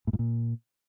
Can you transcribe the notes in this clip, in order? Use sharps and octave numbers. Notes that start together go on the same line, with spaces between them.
A2
G#2
A#2